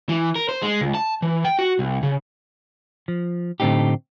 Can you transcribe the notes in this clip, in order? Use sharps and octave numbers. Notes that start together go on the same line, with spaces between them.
E3
A#4
C5
G#3
C#2
A5
E3
G5
F#4
C2
C#3
F3
A2 D3 A3 C4 D#4 G4